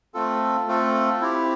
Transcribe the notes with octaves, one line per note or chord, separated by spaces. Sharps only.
A3 C4 F4 A4
A3 C4 F4 A4
C4 E4 G4